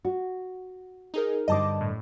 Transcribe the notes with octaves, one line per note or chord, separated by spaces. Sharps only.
F#4
D#4 G#4 A#4
G2 D3 C5 D#5 A5 D6
A2